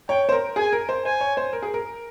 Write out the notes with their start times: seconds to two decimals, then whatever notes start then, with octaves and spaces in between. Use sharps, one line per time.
0.09 C#5 G5
0.29 C5
0.32 A#4
0.56 G#4 G#5
0.72 A#4
0.89 C5
1.05 C5 G#5
1.21 C#5
1.37 C5
1.53 A#4
1.63 G#4
1.74 A#4